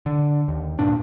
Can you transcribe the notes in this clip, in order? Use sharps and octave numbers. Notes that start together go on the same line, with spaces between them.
D3
D#2
G2 A#2 D4